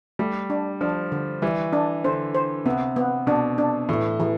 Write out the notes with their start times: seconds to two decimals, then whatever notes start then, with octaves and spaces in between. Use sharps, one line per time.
0.19 G3 A3
0.50 D4
0.81 F3 D4
1.12 D3
1.42 E3 G3
1.73 D4
2.04 D3 C5
2.35 C5
2.65 C3 B3
2.96 B3
3.27 B2 D4
3.58 D4
3.89 A2 E3
4.20 E3